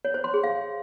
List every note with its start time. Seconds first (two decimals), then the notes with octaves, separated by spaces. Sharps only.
0.05 C#5
0.14 C5
0.24 C6
0.34 G#4
0.44 F5